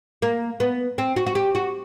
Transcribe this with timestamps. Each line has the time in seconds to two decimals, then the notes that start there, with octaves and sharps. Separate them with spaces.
0.22 A#3
0.60 B3
0.98 C4
1.16 F#4
1.26 F#4
1.35 G4
1.55 F#4